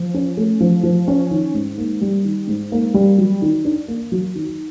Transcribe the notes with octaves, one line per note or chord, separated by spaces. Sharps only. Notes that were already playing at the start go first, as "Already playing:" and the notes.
Already playing: F3
C#4
A3
F3
F3
C#4
D#3
G#2
A#3
G3
D#3
G#2
A#3
G3
F#3
D#3
D4
A#3
F#3
D#3